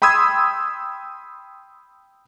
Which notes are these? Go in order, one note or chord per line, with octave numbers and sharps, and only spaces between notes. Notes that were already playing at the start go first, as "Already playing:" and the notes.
G5 B5 C6 D#6 E6 G#6